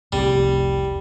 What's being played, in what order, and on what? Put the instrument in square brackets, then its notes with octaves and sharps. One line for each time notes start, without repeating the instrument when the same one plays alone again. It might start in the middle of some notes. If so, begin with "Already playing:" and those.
[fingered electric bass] F1 C2 [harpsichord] G3